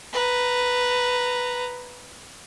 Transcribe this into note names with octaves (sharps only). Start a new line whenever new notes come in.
B4 A#5